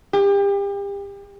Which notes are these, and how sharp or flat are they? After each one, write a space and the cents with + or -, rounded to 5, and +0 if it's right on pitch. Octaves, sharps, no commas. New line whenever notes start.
G4 +35